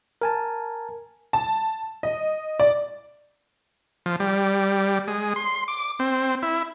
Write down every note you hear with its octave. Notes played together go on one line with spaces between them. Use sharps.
A#4 G#5 A5
A5
D#5
D5
F3
G3
G#3
C6
D6
C4
E4